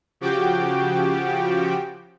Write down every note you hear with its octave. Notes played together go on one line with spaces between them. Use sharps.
C#3 F3 F#4 G4 G5 D6